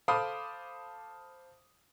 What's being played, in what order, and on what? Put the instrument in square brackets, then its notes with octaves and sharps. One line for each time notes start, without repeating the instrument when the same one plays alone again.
[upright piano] A4 C5 F5 B5 D6 D#6